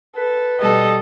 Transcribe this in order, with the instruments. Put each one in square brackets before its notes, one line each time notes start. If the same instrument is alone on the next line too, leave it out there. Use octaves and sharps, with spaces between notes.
[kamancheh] A4 [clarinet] B4
[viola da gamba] B2 G3 [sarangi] A4 [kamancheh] D#5